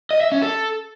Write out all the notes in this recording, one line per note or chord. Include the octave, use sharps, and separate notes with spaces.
D#5
E5
C#4
A4